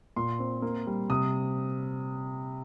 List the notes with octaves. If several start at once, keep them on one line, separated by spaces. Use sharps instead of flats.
A#2 C6
C4
A#3
G3
C3 D#6